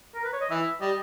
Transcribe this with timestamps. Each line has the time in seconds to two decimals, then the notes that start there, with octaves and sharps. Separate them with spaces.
0.15 A#4
0.24 B4
0.33 C#5
0.41 D#5
0.50 E3 E5
0.81 G3 D#5